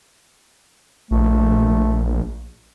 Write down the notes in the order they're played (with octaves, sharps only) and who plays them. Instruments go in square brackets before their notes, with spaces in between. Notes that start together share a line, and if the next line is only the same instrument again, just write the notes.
[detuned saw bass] A#1 [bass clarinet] A3